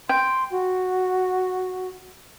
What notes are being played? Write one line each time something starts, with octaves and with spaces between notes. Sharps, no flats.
G5 C6
F#4